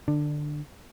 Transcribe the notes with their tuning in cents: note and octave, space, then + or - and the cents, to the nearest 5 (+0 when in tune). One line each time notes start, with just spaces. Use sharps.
D3 +20 D4 +10